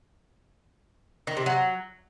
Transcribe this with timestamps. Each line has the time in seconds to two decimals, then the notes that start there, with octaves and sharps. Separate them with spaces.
1.27 D#3
1.37 C3
1.46 F#3